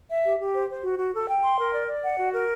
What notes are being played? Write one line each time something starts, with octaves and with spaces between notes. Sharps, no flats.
E5
G4
G4
C5
C5
F#4
F#4
A4
G5
C6
A#4
D5
D5
F#5
F#4
A#4